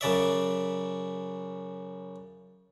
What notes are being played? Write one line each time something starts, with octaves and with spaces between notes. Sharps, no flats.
F#2 C#3 D5 E5